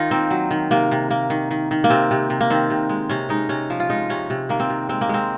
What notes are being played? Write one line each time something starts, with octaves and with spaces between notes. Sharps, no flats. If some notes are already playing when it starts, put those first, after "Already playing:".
Already playing: D#3 D#4 F4
A#3 C4
F#3
D#3
C3 A#3
C3
A#3
D#3
D#3
D#3
A#3
C3 C4
C3
C3
A#3
D#3 C4
C3
G#3
C3 C#4
G#3 D#4
C3 C#4
F3
F4
G#3 D#4
C3 C#4
C3
D#3 A#3
C4
C3
G#3 C4
A#3
G#3 C4